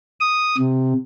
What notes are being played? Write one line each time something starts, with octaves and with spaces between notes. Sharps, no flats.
D#6
C3